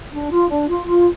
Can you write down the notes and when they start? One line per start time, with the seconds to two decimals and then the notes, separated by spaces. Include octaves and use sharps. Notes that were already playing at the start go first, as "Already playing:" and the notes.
0.12 D4
0.31 F4
0.50 D4
0.69 F4
0.87 F4